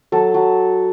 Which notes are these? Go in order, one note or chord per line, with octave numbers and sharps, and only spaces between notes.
F#3 A4
F#3